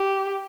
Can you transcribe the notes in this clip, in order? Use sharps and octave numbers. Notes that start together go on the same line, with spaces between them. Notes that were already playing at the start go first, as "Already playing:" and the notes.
Already playing: G4